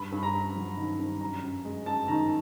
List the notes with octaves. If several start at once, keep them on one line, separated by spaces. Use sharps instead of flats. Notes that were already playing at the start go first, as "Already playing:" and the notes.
Already playing: G2 B5
G2
A#5
G2
F#3
D#3
G2
F#2 A#5
F#2
G#3
F#2 A5
D#3 A#5